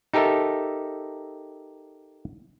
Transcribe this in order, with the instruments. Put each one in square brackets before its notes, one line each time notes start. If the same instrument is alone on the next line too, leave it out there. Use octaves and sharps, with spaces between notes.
[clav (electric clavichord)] D#4 G4 A4 A#4 E5 A5